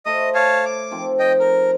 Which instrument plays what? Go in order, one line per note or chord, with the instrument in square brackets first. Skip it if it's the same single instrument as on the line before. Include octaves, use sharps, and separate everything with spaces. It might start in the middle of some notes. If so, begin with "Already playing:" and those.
[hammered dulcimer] A3 A4 C5 [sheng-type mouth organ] D#5 D#6
[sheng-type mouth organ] C#5 F5 A5
D6
[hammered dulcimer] D#3 F3 C4
[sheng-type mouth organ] D#5 G5
A#4